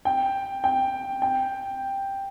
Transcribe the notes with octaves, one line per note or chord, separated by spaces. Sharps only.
G5
G5
G5